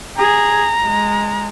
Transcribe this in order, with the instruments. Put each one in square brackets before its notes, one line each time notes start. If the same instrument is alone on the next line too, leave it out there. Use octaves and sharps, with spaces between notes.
[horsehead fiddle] G#4 [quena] A#5
[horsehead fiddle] G#3